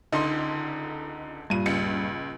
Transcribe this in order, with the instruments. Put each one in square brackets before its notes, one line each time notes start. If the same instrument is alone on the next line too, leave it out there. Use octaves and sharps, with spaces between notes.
[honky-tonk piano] C#2 D3 [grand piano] D#4 C6
[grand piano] G2 A#2 D#7
[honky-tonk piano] C#2 C#7